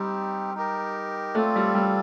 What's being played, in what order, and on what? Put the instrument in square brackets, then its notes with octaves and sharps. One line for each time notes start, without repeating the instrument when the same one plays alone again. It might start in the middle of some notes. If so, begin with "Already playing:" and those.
Already playing: [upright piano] G3 [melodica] C4 D#4 G4
[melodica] D#4 G4 A#4
[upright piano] A3 [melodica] C4 F4 A4 D5
[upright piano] G3
G3